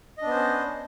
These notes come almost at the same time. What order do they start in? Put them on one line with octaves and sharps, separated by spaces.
D#5 D4 B3 C5 C#4